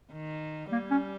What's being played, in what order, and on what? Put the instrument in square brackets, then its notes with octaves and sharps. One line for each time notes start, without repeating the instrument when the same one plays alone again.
[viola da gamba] D#3
[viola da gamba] G3 [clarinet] A#3
[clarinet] C#4